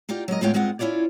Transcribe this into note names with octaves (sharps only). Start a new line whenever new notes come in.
D#4 F4 G4 D5
F#3 G#3 A#4 D#5
A2 G#3 B3 F4 C#5 G5
G2 G#3 C4 F4 F#5
C#4 E4 F4 C#5 D5